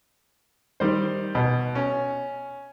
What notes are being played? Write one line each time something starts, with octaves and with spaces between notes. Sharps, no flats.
D#3 G3 C5
B2
C#4